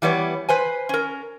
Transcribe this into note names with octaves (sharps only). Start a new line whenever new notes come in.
E3 G3 B3 C#5
B4 C5 G#5
C#4 A#4